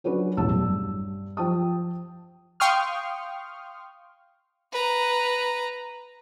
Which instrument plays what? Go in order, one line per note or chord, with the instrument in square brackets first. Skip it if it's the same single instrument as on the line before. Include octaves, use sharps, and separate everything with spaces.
[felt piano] F#3 C#4 D4 F#4 B4
E1 A1 F#2 A5 E6
G2
F3 C5 G5 A5 D#6
[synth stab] F5 G5 C6 C#6 D#6 F6
[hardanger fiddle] B4 A#5